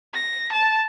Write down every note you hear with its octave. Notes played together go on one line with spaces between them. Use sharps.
A#6
A5